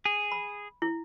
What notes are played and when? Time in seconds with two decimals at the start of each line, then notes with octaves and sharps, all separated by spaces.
0.05 G#4
0.32 B5
0.82 E4